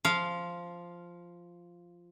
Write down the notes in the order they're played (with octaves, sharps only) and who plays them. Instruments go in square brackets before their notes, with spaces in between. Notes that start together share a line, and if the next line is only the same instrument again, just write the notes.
[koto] F3 F5